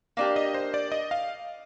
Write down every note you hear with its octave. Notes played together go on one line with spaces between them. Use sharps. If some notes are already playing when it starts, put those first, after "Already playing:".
A#3 D4 G4 F5
D#5
C5
D5
D#5
F5